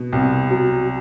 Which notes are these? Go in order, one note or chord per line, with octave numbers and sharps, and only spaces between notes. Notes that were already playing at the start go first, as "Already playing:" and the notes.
Already playing: B2
C2
F#3